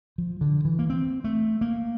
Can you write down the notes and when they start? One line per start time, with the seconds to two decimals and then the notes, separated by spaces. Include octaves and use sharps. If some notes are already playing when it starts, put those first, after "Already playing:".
0.18 F3
0.41 D3
0.65 E3
0.79 A#3
0.90 C4
1.24 A3
1.61 A#3